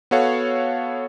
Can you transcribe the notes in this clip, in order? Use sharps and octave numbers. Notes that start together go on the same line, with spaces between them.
B3 F#4 A4 C#5 F5 F#5